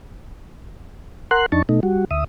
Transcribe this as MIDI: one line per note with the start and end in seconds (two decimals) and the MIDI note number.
1.31 1.46 70
1.31 1.46 78
1.31 1.46 84
1.31 1.46 90
1.52 1.62 41
1.52 1.62 62
1.52 1.62 63
1.52 1.62 81
1.52 1.62 85
1.69 1.80 47
1.69 1.80 57
1.69 1.80 63
1.83 2.05 55
1.83 2.05 66
2.11 2.24 38
2.11 2.24 76
2.11 2.24 87